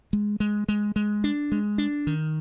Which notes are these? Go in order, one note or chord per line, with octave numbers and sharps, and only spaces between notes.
G#3
G#3
G#3
G#3
D4
G#3
D4
D#3